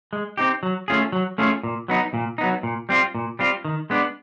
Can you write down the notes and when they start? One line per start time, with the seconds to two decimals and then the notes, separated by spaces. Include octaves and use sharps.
0.13 G#3
0.37 C4 D#4 G4
0.63 F#3
0.88 A3 C#4 F4 G#4
1.12 F#3
1.38 A3 C#4 F4 G#4
1.63 A#2
1.88 F#3 B3 D#4
2.14 A#2
2.38 F#3 B3 D#4
2.63 A#2
2.89 G3 C4 F4
3.15 A#2
3.39 G3 C4 F4
3.65 D#3
3.90 G#3 B3 D4